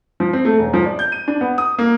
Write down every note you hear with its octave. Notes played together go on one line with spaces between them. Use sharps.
F3
C4
A3
E1
F3
D5
G6
D#7
D4
B3
D#6
A#3